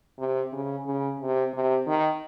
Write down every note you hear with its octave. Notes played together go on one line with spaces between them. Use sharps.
C3
C#3
C#3
C3
C3
D#3